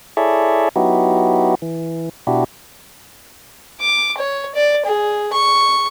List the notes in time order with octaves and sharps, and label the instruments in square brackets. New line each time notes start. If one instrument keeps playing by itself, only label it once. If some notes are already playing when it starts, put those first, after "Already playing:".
[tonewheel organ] E4 G#4 A4 C#5 D5 E5
F#3 B3 D#4 E4 F#4 G4
E3
B2 D4 E4 F#4 G4
[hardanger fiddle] D6
C#5
D5
G#4
C#6